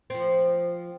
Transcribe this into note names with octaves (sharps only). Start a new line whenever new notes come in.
F3 C4